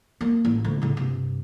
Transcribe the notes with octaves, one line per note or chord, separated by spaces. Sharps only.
A#3
A1
D2
A2 C#3
G2 C3